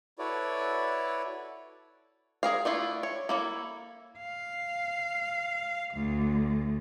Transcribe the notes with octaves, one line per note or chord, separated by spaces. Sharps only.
E4 F#4 A4 B4 C#5 D5
G#4 A#4 F5
A3 D4 E4 F4
C#5
A#3 E4 A4
F5
D2